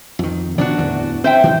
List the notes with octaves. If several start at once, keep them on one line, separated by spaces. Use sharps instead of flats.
F2 D#3
B2 D#3 F3 D4 F#4
D1 E2 E3
C4 C5 E5 G5
D#3 F3 G3